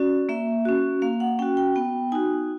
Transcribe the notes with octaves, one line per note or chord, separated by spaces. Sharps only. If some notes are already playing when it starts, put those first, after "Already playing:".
Already playing: C#4 F#4 D5
A#3 E5
C#4 F#4
A#3 F5
F#5
C#4 F#4 G5
G5
B3 G5
D#4 F#4 G#5